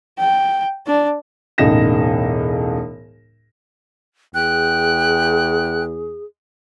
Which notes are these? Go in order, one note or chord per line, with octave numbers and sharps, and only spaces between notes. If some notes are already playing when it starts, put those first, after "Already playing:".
G5
D4
E1 C#2 A2 D#4 A#6 E7
E2 G#4 G5 F#6